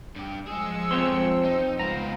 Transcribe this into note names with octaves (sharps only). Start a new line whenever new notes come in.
G2 G4
F3 G#3 G#4 E6 C#7
F2 C4 C#5 C6
D#4
C#2 B3 C5 F5 A#5